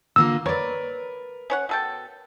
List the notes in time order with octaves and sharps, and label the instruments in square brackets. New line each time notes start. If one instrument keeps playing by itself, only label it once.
[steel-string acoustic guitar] D3 A#3 F4 [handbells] E6
[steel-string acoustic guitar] A#4 B4 [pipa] C#5 D5
[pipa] C#4 C#5 F#5
B2 A4 G5